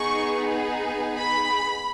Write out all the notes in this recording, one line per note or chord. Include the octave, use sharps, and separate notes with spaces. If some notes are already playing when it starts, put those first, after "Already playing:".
Already playing: B3 D#4 G#4 C#6
B5